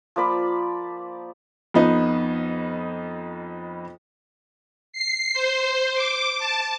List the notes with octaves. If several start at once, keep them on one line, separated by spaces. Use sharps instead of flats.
F3 A#3 D5 B5
F2 B3 D#4
C7
C5
D6
A5